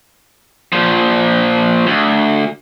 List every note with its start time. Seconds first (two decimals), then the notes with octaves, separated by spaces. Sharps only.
0.73 A#2 F3
1.87 D2